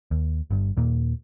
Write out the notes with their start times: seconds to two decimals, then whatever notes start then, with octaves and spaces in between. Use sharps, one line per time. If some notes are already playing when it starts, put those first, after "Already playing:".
0.11 D#2
0.51 G1 G2
0.77 D#2 A#2 A#3